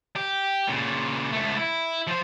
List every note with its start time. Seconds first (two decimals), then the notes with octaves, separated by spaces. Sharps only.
0.16 G4
0.68 A#2 C#3
1.32 C#2 A3
1.57 E4
2.07 F3 C5